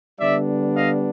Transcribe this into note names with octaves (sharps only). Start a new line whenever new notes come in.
D3 G3 B3 D4 D5 E5
D#5 F5